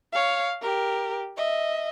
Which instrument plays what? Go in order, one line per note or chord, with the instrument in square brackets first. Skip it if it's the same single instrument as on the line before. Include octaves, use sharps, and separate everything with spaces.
[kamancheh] C#5 F5
G4 A#4
D#5 E5